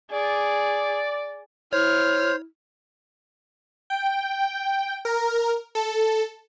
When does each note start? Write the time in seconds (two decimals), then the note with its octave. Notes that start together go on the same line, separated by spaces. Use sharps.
0.12 G#4 D5
1.73 E4 C5 C#5 F6
3.90 G5
5.05 A#4
5.75 A4